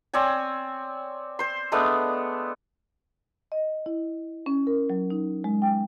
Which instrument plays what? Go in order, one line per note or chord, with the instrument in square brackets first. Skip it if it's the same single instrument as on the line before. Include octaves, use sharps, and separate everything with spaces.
[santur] C4 C#5 D5 G#5
C5 C6
G#3 A3 B3 D4
[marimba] D#5
E4
C#4
A#4
F#3
D#4
G#3
G5